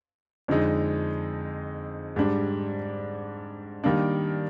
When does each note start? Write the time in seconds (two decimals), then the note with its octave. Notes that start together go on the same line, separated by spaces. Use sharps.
0.48 F2 D3 G#3 D#4
2.16 G#2 G3 D4
3.84 D#3 G3 A#3 D4